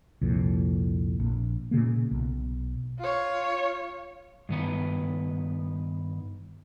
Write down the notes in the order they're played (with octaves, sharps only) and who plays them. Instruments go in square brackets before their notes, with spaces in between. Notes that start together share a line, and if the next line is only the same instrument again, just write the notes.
[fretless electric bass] C2 F2 A#2
A#1
A#2 C#3 A#3
B1
[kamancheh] F4 C#5
[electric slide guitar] G2 D#3 B3